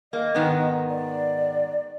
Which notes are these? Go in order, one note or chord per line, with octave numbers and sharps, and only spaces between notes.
A#3 D#5
G#2 D#3 B3
D5